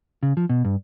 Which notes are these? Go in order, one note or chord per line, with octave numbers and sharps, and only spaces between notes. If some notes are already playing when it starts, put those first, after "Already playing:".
C#3
F3
B2
G2